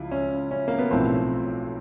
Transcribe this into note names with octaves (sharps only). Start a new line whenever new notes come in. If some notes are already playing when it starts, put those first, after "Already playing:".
Already playing: C#2 C#3 F3 E4 F4
C#4
C#4
A#3
B3
B1 A2 F3 C4